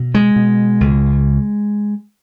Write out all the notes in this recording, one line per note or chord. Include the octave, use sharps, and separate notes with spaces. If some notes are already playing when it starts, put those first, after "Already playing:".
Already playing: B2
G#3
B2
C#2